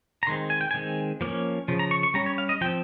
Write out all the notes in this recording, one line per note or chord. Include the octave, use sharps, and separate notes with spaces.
A#5
D#3 G#3 C4 C6
G#5
G5
D#3 G#3 C4 G#5
F3 A#3 C#4
C#3 F3
A#5
C#6
C#6
G3 C#4 A#5
C#5
F5
D#5
F3 C4 G5